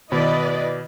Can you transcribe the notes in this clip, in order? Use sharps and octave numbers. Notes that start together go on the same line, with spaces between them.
B2 D#3 E4 B4 D5 D#5